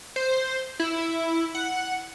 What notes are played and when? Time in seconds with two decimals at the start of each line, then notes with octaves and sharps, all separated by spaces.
0.16 C5
0.79 E4
1.55 F#5